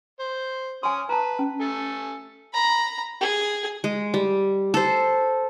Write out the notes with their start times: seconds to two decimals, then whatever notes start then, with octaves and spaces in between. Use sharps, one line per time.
0.20 C5
0.83 C#4 G#5 C6 D#6
1.09 B4 A5 A#5
1.39 C#4
1.60 A3 A4 G#5
2.53 A#5 B5
3.21 G#4
3.84 G#3
4.14 G3
4.74 A4 C5